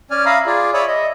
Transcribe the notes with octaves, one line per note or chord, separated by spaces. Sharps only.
C#4 D5 G#5 F6
E5 F5 A#5 B5 D#6
F4 G#4 D5
C#5 D5 E5 B5 D#6
D#5 E5